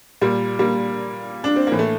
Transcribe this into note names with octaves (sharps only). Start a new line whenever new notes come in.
A#2 G3 A#3
G3 A#3
D4
C4
A2 E3 A#3
A3